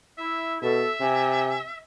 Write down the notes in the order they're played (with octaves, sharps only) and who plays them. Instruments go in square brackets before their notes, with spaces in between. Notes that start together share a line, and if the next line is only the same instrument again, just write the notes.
[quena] E4 [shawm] E5
[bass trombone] B2 [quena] A4 [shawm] E5
[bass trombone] C3 [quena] G#5